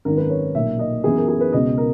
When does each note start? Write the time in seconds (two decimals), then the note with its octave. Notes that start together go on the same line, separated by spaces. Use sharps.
0.05 G#1 F#2 D#3 A#4
0.17 B4
0.30 C#5
0.55 B1 A#2 A#3 E5
0.79 D#5
1.03 F#2 E3 B3 G#4
1.16 A#4
1.28 G#4
1.41 B4
1.53 C#2 B2 G#3 B3 D#5
1.78 A#4